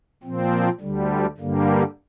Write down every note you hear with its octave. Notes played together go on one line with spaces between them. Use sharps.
A#2 F3 C4
D2 D3 G3
G2 D3 G3 A#3